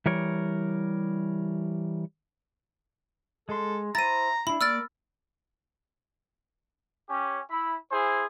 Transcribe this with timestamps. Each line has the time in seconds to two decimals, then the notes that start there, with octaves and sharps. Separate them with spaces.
0.06 E3 G3 A#4 C#5
3.49 G#3 A4 C6
3.95 E4 C5 A#5 A6 D#7
4.47 D4 E4 B5
4.61 A#3 D5 E6 F6 A6
7.09 C#4 G4
7.50 E4 B5
7.92 E4 G#4 C5 G#5